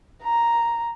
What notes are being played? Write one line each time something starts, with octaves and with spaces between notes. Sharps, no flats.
A#5